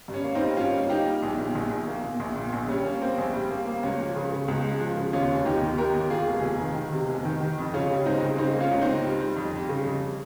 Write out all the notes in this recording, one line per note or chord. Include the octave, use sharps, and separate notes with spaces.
G2
C#4
A#3
C4 D#4
G3
G2 C#4 F4
A#3
A#3 D#4 G4
G3
A#1
A#2
A#1
A#1
A#3
A#2
A#1
A#2
A#1
G3 C#4
A#3 C#4
A#3 C4
A#1
G3
A#3
A#3
C#2 C#4
F3
C#3
C#3
C#2
G#3
F3
C#3
D#2 C#4 F4
F1
D#2 D#4 G4
D#2
D#2 G4 A#4
D#2
D#2 F4 G#4
F1
F1
D#3
D#3
C3
F1
D#3
D#3
F2
C#3 C#4 F4
G3
C#2 C4 D#4
C#3
C#3 C4 D#4
A#3
C#4 F4
C#2
C4 D#4
C#2
G3
G3
F2
G3
C#3
F2